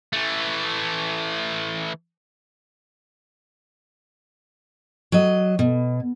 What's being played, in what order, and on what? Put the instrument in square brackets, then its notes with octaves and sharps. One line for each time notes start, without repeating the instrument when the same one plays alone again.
[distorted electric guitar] E3 A3
[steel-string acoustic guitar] F#3 D#5
B2